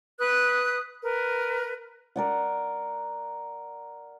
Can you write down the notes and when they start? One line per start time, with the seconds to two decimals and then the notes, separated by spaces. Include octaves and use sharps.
0.18 B4 D#6 F#6
1.02 A#4 B4
2.16 A#4 D5 F#5